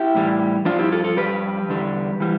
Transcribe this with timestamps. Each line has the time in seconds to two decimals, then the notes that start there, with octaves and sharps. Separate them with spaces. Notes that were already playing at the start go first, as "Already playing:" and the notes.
Already playing: E4 G4
0.15 A2 E3 G3
0.65 G2 F3 D4 F4
0.79 E4 G4
0.92 F4 A4
1.04 F4 A4
1.17 F2 C3 G3 G4 B4
1.69 E2 D3 G3
2.20 E3 G3